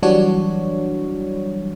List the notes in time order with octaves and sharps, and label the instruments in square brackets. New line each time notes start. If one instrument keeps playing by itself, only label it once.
[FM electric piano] E3 F#3 G3 D4 F#4 C#5